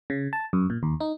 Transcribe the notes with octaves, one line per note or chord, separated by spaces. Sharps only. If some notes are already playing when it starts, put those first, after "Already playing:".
C#3
A5
F#2
A#2
D#2
D#4